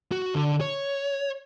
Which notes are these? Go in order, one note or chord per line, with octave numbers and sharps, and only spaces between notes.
F#4
D3
C#5